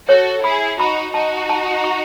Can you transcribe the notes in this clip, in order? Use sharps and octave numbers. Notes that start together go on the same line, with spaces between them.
F#4 A4 C#5
E4 G#4 B5
D#4 F#4 B5
D#4 F#4 A5
A5
C#6